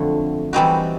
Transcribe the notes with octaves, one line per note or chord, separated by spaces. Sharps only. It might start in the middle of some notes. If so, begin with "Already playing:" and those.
Already playing: F2 D3 F#3 A3
E3 G3 C4 D#4 F#4